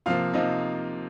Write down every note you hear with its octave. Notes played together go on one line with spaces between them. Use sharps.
C3 F3 A#3 F4 F5
C3 F3 A#3 D#4 D#5